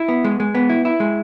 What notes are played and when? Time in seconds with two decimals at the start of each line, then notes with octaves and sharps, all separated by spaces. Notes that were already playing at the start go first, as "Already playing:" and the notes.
Already playing: E4
0.08 B3
0.24 G#3
0.40 G#3
0.55 B3
0.69 E4
0.85 E4
1.00 G#3